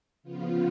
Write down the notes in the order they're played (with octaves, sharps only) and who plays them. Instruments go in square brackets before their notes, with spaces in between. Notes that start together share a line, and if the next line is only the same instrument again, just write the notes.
[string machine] C#3 F3 B3 F4